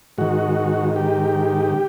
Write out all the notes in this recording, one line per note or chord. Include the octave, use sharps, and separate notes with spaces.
G#2 D#3 F#4
G4